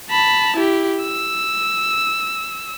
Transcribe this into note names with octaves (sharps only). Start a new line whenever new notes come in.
A5 B5
E4 G4
E6